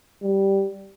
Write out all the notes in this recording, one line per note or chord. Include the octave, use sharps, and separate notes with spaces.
G3